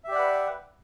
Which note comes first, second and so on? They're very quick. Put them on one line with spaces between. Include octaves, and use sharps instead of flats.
E5 G4 D5 F#5 B4